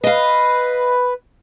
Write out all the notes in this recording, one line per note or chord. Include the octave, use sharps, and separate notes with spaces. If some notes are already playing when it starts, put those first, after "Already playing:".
B4 D#5 F5